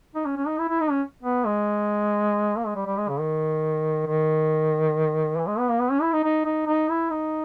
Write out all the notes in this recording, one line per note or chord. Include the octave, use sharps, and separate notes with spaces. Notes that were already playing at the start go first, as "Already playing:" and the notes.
D#4
C#4
C#4
D#4
E4
E4
D#4
C#4
B3
G#3
A#3
G#3
G3
G3
G#3
C#3
D#3
D#3
E3
G#3
B3
A#3
B3
C#4
E4
D#4
D#4
D#4
D#4
E4
D#4